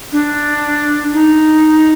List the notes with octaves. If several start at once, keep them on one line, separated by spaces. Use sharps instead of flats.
D4
D#4